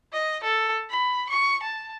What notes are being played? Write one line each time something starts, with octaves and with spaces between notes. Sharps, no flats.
D#5
A4
B5
C#6
A5